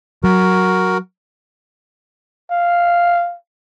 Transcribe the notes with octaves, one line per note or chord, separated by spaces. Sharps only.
F#3 F#4 A#4
F5